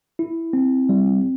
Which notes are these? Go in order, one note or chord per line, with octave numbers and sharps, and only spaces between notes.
E4
C4
G3